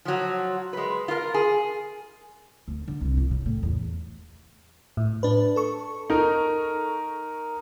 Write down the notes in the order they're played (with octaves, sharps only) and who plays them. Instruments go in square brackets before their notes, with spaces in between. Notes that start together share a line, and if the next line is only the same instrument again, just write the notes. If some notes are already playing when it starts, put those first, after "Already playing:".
[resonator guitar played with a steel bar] F3 F#3
G#3 B4
F4 A#4
G#4
[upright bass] D2
D3
C2
E3
C#3
A2
E2
[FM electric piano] A2
D4 B4
A4 C#6
[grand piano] D#4 A#4